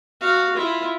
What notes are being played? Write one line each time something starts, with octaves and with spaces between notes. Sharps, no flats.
F#4 F5
E4 F4